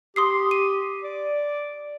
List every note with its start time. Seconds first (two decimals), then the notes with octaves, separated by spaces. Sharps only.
0.16 G4 C6 D#6 C7
0.51 D#7
1.03 D5